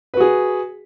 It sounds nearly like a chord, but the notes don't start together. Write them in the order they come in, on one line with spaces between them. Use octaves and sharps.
B4 F#4 G#4